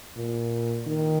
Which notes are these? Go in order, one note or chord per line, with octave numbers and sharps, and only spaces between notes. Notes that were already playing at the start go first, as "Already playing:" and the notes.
A#2
D#3